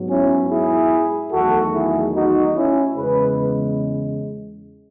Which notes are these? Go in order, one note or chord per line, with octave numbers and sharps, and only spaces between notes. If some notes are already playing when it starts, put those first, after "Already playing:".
Already playing: G#2 F#3 B3
C#4 E4
E4 G#4
E2 D#3 F#3 A3 F#4 A4
E4 G#4
D#4 F#4
C#4 E4
E2 C#3 G#3 G#4 B4